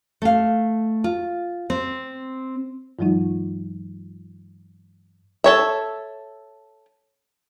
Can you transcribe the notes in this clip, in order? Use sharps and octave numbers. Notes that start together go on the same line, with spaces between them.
A3 F5
F4
C4
G2 E3 F#3 G#3 D#4 F4
A4 C#5 E5